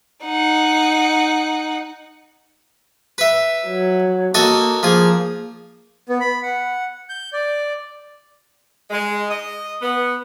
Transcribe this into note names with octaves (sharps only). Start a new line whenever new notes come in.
D#4 F#5
B4 E5
F#3
A#3 F#4 A4 D#5
F3 A#3 G#4
B3
B5
F#5
G6
D5
G#3
D#5
B3